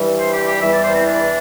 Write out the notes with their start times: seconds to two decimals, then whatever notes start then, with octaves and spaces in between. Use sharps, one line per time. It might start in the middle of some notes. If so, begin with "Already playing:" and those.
Already playing: G2 E3 G3
0.19 C5
0.33 G4
0.47 G4
0.62 E2 E3 G3 E5
0.72 D5
0.84 C5
0.95 C4
1.05 D4